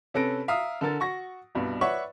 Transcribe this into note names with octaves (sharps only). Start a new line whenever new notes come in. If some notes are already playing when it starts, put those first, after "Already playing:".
C3 C#4 A4 B4 A#6 D7
E5 F5 A#5 D#6
D3 A4 A#4 A6
F#4 C#6 A#6
C2 G2 B2
B4 C#5 D5 E5 F#5 C#6